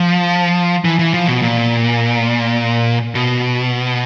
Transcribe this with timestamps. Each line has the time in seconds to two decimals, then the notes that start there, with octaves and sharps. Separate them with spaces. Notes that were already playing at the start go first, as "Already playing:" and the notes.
Already playing: F3
0.85 E3
0.99 E3
1.14 F3
1.27 B2
1.42 A#2
3.15 B2